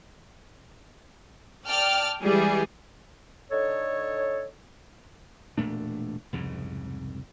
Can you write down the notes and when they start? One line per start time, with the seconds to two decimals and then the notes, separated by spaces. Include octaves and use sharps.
1.67 D5 G5 A5 F6
2.21 E3 G3 G#3 G#4
3.51 D3 D#4 A4 C#5
5.58 E1 A#2 A3 D4
6.33 C2 F2 G#2 C#3